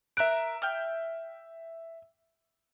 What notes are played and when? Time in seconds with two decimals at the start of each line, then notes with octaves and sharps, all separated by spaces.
0.17 A#4 E5 F#6 D7
0.62 G5 F6